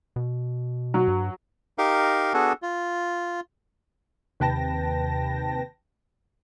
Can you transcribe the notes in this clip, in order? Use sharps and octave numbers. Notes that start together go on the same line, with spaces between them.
B2
F#3
G2
D#4 G4 A#4 F5
B3 D4 F#4 G#4 A4
F4
D#2 C3 B4 G5 A5 A#6